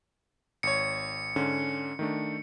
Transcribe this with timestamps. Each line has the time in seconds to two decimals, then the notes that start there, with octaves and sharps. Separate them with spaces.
0.63 G#1 C#5 C#7
1.36 G#2 D3 C#4
1.99 D#3 A3 D4